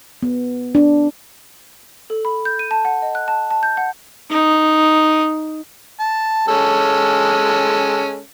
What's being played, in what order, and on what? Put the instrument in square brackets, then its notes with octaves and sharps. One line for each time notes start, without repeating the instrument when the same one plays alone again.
[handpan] B3
D4
[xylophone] A4
B5
G6
D#7
A5
F#5
D#5
F#6
A5
A5
G6
F#5
[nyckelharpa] D#4
[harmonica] A5
G#3 C#4 A4